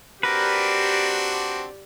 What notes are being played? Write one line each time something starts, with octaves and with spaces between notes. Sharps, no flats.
C4 D4 F#4 G4 A#4 B4 D5